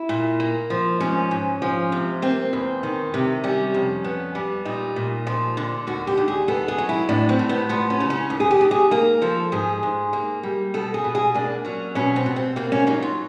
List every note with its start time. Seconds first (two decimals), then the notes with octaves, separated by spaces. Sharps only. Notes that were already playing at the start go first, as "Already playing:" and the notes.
Already playing: E4
0.09 A#2
0.40 A#3
0.70 F3
1.00 G#2 C#4
1.31 G#2
1.62 F3
1.92 C3
2.22 A#3 C4
2.53 E2
2.83 D#3
3.14 C3
3.44 G3 C#4
3.74 F2
4.04 B3
4.35 G3
4.65 A#2 D#4
4.96 A#2
5.27 F3
5.57 D3
5.87 D#2 F#4
6.07 G4
6.17 D#2
6.28 G#4
6.48 B3 A4
6.68 G#4
6.78 F#3
6.89 E4
7.09 A2 D4
7.29 C4
7.39 A2
7.49 B3
7.69 F3 B3
7.90 C#4
8.00 C#3
8.10 C#4
8.30 D#2
8.40 G#4
8.51 G4
8.61 D#2
8.71 G#4
8.91 A#3 A#4
9.22 F3 A4
9.52 G#2 G#4
9.83 G#2
10.13 A#3
10.43 G3
10.74 B2 A4
10.94 G#4
11.04 B2
11.15 G#4
11.34 A#3 D4
11.65 F#3 C#4
11.95 B2 C#4
12.16 C4
12.26 B2
12.36 C4
12.56 A#3 C4
12.72 C#4
12.87 F#3 D#4
13.02 F4